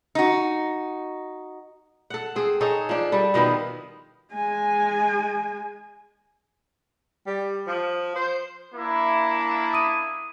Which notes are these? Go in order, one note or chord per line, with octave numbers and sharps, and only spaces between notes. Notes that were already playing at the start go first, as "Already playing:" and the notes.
D#4 F#4
A4 F#5
C4 G#4
D#4 G#4 A4 C#5
F3 D4
G3 A4
B2 D#3 F3 B3
G#3 G#5
G3
F3
C5
A#3 D4 E4
D#6 D#7